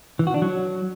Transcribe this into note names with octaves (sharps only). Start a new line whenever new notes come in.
E3
F#4
D4
F#3